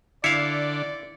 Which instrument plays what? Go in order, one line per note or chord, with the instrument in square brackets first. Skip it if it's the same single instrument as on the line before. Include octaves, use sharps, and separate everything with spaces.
[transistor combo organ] D3 [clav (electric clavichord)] E4 F5 [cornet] D5 [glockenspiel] C#7